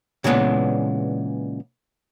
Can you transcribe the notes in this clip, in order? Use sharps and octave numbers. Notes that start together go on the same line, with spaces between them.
A#2 C#3 E3 G#3 B3 D4